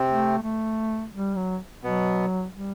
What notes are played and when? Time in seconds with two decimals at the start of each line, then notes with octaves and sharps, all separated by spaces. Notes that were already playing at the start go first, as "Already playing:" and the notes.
Already playing: C3 C4
0.08 A3
0.43 A3
1.13 G3
1.36 F#3
1.83 B2 F#3 B3
2.53 G3